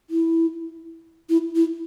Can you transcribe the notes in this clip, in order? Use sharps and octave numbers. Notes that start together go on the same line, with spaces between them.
E4
E4
E4